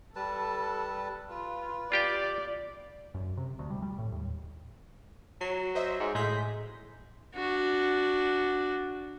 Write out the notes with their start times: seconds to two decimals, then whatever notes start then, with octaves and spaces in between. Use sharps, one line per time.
0.16 G3 A4 B4 A5
1.30 F4 B4
1.92 F4 G4 D5 G5
3.14 F#2
3.37 C3
3.59 D2
3.70 G3
3.82 G3
3.98 A2
4.12 D#2
5.41 F#3 C7
5.75 C5 D#5 E5
6.00 G#2
6.15 A2 G#3 G6 B6
7.35 D4 F#4